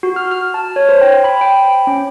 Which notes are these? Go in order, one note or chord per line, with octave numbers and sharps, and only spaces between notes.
F#4
F6
F6
A5
C#5
C5
G5
B5
G5
C#4